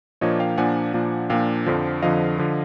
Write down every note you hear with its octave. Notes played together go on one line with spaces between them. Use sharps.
A#2 F3 A#3 D4 C#5 D#5
F5 G5
A#2 F3 A#3 D4 F#5 G#5
A#2 F3 A#3 D4
A#2 F3 A#3 D4 F5 G5
F2 D3 F3
F2 D3 F3 D#5 F5
D3 F3